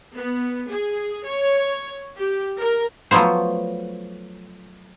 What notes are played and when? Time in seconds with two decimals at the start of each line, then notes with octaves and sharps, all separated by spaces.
0.16 B3
0.69 G#4
1.26 C#5
2.17 G4
2.59 A#4
3.11 F3 F#3 A3 B3 C5